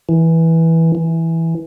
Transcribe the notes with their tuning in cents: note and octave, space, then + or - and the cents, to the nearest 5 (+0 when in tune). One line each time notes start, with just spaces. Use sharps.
E3 -10
E3 -5